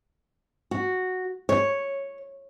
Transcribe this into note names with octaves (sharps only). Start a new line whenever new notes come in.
F#4
C#5